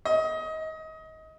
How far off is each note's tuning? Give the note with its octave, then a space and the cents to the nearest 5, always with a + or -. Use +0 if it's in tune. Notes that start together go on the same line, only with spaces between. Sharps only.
D#5 +25